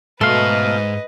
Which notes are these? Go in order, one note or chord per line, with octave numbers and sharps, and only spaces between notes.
G#2 B2 A3 A4 B4 D#5 F5 C6